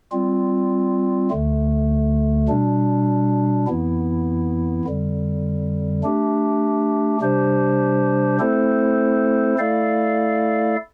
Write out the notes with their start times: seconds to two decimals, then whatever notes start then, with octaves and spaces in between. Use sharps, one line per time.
0.12 G3 C4 F4
1.30 D2 D3 A3
2.49 B2 G3 D4
3.67 F2 E3 B3 E4
4.85 F2 D3 G3
6.03 A3 D4 G4
7.21 C3 G3 D4 G4 C5
8.39 A3 C4 E4 A4 C5
9.58 A3 E4 A4 D5 F5